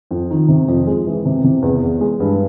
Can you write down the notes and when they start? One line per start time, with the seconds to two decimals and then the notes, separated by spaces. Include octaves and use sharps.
0.11 F2
0.30 D#3
0.48 C3
0.68 F2
0.87 G#3
1.07 E3
1.25 C3
1.44 C3
1.62 E2
1.83 E2
2.01 G#3
2.20 G2